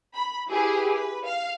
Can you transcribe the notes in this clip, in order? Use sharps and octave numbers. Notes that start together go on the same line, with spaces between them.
B5
E4 G4 G#4 B4
B4
F5